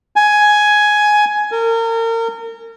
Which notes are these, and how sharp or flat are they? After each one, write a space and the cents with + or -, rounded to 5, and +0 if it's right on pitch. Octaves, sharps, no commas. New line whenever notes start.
G#5 +10
A#4 -35